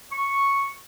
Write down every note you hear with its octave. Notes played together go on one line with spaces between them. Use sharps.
C#6